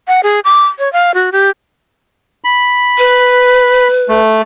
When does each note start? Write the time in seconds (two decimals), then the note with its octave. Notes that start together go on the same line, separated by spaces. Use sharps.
0.08 F#5
0.23 G#4
0.44 D6
0.79 C#5
0.93 F5
1.14 F#4
1.32 G4
2.44 B5
2.98 B4
4.09 A3